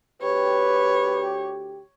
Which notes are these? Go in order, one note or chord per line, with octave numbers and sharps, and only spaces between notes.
D2 G4 B4 C#5